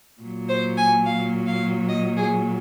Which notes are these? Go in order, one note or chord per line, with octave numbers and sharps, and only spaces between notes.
A#2 F#3
C5
G#5
F5
F5
D#5
G#4